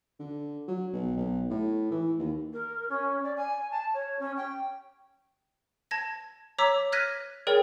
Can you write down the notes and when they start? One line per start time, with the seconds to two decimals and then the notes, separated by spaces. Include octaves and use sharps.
0.19 D3
0.68 F#3
0.93 B1
1.17 B1
1.50 A2
1.91 E3
2.19 D#2
2.53 A#4
2.90 C#4
3.23 D5
3.36 G#5
3.71 A5
3.94 C#5
4.19 C#4
4.37 G5
5.91 A5 G#6 A#6
6.59 C#5 A#5 D6 E6 B6
6.92 F6 F#6 G#6 A#6 B6 D#7
7.47 G#4 A#4 C#5 D5 G5